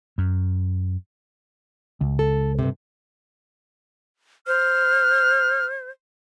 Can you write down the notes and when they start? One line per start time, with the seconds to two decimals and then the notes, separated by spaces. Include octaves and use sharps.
0.18 F#2
2.01 C#2
2.19 A4
2.59 G2 C3
4.47 C5 F6